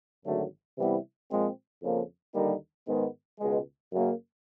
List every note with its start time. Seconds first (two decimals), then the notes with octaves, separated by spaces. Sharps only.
0.25 G#1 F#2 D3 F#3 A3
0.78 C3 E3 G3 B3 E4
1.30 A#2 F3 G#3 C4
1.83 F2 C#3 F3 A#3
2.35 D#2 D3 G3 A#3 D#4
2.87 G#2 D#3 G#3 B3
3.40 C#2 B2 G#3
3.92 F#2 C#3 F#3 A#3